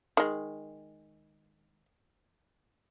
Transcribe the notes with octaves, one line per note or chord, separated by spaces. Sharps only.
D#3 G#3